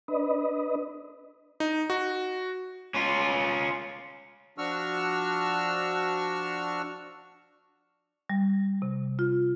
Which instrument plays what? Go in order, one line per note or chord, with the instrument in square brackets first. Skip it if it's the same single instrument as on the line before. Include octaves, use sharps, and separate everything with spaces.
[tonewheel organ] D4 B4 D#5
[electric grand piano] D#4
F#4
[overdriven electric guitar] C#4 F4
[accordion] F3 D4 F#4 C#6 E6 F6
[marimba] G3
C3
F4